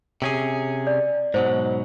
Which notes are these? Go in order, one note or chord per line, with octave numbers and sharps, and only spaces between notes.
C3 C#4 G#4
D5
G#2 B2 F#3 C5